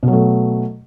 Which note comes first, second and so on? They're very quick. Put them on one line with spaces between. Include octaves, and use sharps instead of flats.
B2 F#3 A3